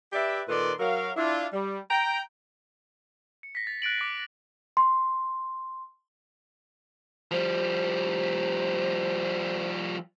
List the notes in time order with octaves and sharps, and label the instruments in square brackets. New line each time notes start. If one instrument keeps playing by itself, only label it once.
[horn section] G4 B4 D5 E5
A#2 D#3 A4 B4 D5 C6
F#3 A#4 F5
D4 E4 F4
G3
G5 A#5
[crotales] C#7
A#6 B6
A6
F#6 A6 D7 F#7
D6 B6
[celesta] C6
[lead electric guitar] F3 G3 [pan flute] C5